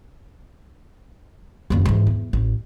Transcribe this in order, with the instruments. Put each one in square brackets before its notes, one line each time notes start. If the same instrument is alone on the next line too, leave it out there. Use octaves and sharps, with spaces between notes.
[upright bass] F#1 D#2
G#2 E3
E2
A1